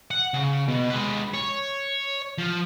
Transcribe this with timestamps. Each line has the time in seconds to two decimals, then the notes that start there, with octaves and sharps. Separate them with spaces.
0.11 F#5
0.34 C#3
0.68 B2
0.90 G#3 B4
1.34 C#5
2.38 F3